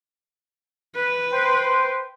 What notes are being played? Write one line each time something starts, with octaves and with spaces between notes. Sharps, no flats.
B4
C5 G5 C6